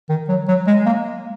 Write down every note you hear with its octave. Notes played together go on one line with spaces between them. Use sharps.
D#3
F#3
F#3
G#3
A#3